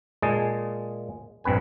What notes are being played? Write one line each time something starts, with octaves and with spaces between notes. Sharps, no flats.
A#2 G#3 G#4 A5
A#1 G2 C4 B4 G#5